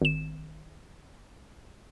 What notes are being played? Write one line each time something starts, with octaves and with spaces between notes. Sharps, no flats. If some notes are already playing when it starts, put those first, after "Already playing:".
G#1 E7